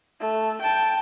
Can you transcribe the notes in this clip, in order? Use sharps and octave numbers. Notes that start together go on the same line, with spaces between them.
A3
G5 A5